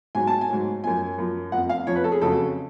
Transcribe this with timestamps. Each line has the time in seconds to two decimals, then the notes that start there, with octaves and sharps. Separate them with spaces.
0.15 G#2 F#3 G#5
0.27 A5
0.41 G#5
0.50 G#2 F#3
0.83 F#2 F3 G#5
1.18 F#2 F3
1.52 F2 F3 F#5
1.69 F5
1.87 F2 F3 C#5
1.96 B4
2.04 A4
2.12 G#4
2.21 F2 C#3 F#3 A4